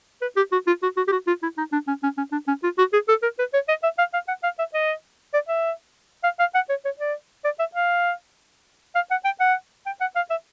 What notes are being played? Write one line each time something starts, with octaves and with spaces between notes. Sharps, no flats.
B4
G4
F#4
F4
F#4
F#4
G4
F#4
F4
E4
D#4
D4
C#4
C#4
C#4
D4
C#4
F4
F#4
G#4
A4
A#4
B4
C#5
D#5
E5
F5
F5
F#5
F5
E5
D#5
D5
E5
F5
F5
F#5
C#5
C#5
D5
D5
E5
F5
F5
F#5
G5
F#5
G5
F#5
F5
E5